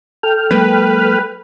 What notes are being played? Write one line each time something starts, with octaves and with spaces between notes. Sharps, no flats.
A4 G5 F6
F#3 G#3 A#3 B4